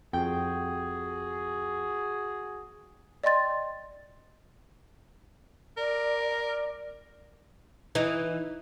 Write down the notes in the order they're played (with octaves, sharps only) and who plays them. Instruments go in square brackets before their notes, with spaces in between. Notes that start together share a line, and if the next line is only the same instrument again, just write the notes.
[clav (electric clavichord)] F2 [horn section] F#4 G#4 [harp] G5
[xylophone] D5 D#5 G5 C6 A6
[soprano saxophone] A#4 [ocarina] D5
[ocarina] D5
[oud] E3 D#4